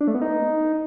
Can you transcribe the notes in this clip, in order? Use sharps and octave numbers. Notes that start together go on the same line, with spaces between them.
D4
A3
B3
D#4